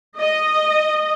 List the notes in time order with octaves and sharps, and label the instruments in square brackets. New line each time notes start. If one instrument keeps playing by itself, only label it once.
[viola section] D#5